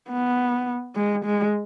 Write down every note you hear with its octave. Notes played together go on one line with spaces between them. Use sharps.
B3
G#3
G#3